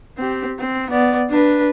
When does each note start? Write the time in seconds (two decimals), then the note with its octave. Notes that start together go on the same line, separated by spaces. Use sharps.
0.17 C4 G4
0.59 C4
0.90 B3 D5
1.30 D4 B4